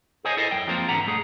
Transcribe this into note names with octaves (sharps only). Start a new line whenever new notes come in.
G#4 C5 C#5 D#5 G#5
E4 A4 A#4 C5 D#5
F#2 F#3 G5
F3 G#3 A#3 C4 F4 C5
G#2 D3 E3 B3 F#5 A#5
B1 G2 A3 G#4